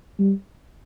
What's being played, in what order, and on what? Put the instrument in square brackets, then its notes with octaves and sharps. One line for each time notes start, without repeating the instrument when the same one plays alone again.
[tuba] G3